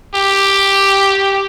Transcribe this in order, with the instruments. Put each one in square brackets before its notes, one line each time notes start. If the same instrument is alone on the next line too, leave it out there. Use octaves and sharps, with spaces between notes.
[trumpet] G4